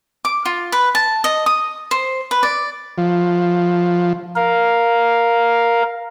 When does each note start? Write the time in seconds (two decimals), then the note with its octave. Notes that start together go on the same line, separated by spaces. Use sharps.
0.25 D6
0.45 F4
0.72 B4
0.95 A5
1.24 D#5
1.46 D#6
1.91 C5
2.31 B4
2.43 D5
2.98 F3
4.36 A#4 F5